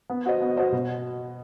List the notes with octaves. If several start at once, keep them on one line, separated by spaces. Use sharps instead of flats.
B3
F#4 C5 D#5
B3
F#4 C5 D#5
B2